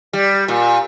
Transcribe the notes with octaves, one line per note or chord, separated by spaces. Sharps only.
G3
A#2